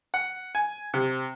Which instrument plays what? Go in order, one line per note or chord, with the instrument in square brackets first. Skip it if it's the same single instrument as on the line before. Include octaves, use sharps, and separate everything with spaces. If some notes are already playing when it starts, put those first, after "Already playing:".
[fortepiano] F#5
G#5
C3